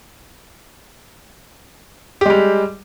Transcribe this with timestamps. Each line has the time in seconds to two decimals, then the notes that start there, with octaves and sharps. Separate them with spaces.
2.21 G4
2.26 G#3
2.30 G3